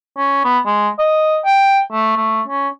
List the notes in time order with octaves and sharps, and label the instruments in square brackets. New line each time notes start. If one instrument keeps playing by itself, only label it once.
[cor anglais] C#4
B3
G#3
D#5
G5
A3
A3
C#4